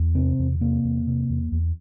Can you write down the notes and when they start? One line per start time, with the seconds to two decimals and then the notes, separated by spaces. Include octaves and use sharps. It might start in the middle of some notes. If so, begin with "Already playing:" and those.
Already playing: E2
0.15 C3 C4
0.39 E2
0.61 C3 A#3
0.84 E2
1.07 C3
1.30 E2
1.52 E2